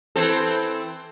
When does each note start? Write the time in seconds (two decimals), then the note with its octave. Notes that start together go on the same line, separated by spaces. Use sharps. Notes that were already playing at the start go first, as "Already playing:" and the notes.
0.16 E3 C4 A4